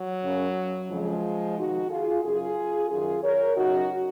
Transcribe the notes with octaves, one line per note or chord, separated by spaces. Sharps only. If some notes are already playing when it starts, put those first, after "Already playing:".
Already playing: F#3
F#2 C#3
F2 C#3 F3 G#3
F2 C3 D#3 D#4 F#4
F4 G#4
F#2 C#3 F4 G#4
F#2 D#3 F4 G#4
A#4 C#5
F#2 C#3 D#4 F#4